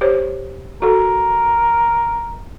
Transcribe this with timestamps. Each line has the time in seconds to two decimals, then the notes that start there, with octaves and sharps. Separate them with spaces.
0.01 G4 C5 C#5
0.82 F#4 A4 A#4